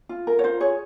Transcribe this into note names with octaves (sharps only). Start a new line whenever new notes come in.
F4
A#4
C#5
F4 C5
G#4 C#5